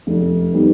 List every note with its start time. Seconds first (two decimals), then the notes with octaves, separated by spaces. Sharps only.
0.07 F1
0.54 D#3 G3 B3